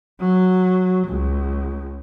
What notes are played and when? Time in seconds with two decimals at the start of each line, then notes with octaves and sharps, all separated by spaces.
0.19 F#3
1.08 C#2